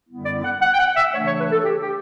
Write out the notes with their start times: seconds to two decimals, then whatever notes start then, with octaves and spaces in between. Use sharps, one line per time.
0.09 F#2 D3 G3 B3 E4
0.26 D5
0.44 F#5
0.61 F#5
0.73 G5
0.78 F#5
0.95 E5
1.12 C#3 E3 A3 D4 C#5
1.25 C#5
1.39 B4
1.51 A4
1.64 G4
1.81 G4